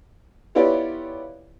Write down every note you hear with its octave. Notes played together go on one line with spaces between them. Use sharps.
B3 E4 F4 G4 C#5 D5